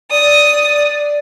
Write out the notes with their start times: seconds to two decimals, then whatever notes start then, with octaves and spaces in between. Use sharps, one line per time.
0.11 D5 D#6